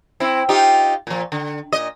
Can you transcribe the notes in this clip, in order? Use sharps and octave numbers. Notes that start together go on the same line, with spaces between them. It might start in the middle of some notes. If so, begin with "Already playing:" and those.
C4 E4
D#4 F4 G4
A#2 F3
D3
A#2 D#5